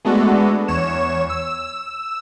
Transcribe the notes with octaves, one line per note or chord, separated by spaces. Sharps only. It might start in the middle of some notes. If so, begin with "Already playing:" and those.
G#3 A3 B3 D4 F#4 A4
E2 C#5 E7
E6